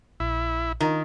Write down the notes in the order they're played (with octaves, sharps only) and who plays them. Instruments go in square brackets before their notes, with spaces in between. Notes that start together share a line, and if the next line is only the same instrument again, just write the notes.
[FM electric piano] A#1 [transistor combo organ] E4
[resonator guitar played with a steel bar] D#3 [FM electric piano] F4 A#4 D#5